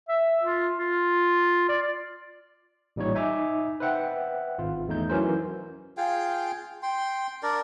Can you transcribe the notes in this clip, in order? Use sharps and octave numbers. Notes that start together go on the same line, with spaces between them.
E5
F4
F4
D5
A1 A#2 G3 D#4 C#5
D#4 E5 G#5 A#5 D6
B4 C5 E5 F#5 G5 B5
G#1 F4
E2 A3 D#4 G6
E3 F#3 C#4 A#4 C5
F4 G#4 F5 G5
G5 C6
D4 A#4 D5